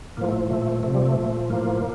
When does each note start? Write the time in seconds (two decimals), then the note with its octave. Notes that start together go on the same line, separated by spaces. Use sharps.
0.17 A2 F3 A#3
0.29 A3
0.50 A#2 F3 A3
0.62 A3
0.72 A3
0.83 C3 F3 A3
0.94 G3
1.06 A3
1.17 A#2 F3
1.50 A2 F3 A#3